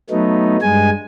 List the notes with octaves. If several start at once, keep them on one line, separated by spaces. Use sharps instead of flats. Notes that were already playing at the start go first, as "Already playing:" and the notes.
F#3 A3 B3 D#4
G2 G#3 G#5